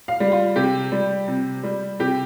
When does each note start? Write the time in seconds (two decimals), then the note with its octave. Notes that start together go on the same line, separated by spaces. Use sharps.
0.08 F5
0.20 G3
0.32 F4
0.56 C3 G4
0.92 G3
1.28 C3
1.64 G3
1.99 C3 G4